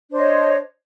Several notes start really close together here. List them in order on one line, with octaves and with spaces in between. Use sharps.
D4 C5 D#5 C#5